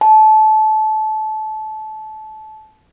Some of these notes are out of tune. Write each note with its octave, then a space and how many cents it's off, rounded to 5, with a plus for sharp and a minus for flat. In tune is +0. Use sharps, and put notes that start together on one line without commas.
A5 -25